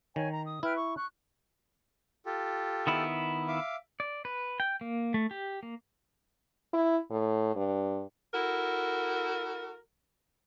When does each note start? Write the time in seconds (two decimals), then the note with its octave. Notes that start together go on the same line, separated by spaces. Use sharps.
0.16 D#3 C#5 G#5
0.32 A#5
0.45 D#6
0.63 E4 B4 G5 F6
0.75 C#6
0.95 C#6 F#6
2.26 F4 G4 A4
2.87 D#3 B3 E4
3.48 E5 F5 D6
4.00 D5
4.25 B4
4.60 G5
4.81 A#3
5.14 A3
5.31 G4
5.63 A#3
6.73 E4
7.10 A2
7.56 G2
8.34 E4 F#4 A4 A#4